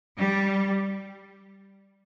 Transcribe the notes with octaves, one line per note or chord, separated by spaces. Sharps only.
G3